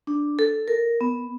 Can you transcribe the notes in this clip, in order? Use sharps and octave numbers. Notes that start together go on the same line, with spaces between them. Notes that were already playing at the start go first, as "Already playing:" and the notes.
D4
A4
A#4
B3